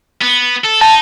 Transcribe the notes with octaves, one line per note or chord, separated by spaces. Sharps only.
B3
A4
D#4 A5